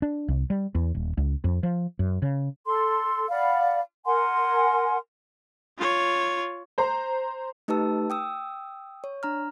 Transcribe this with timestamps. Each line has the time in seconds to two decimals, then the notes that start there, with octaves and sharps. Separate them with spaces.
0.02 D4
0.28 C2
0.50 G3
0.75 E2
0.95 D#1
1.17 C#2
1.44 F2
1.63 F3
1.99 F#2
2.22 C#3
2.65 A4 C6
3.30 D5 F5 F#5 B5
4.06 A#4 F#5 G#5 C6
5.78 F4 C#5
6.78 C5 A#5 C6
7.68 A3 D#4 G4 B4 A5 E6
8.10 G5 D#6 E6
9.04 C#5
9.23 D4 A#5 F6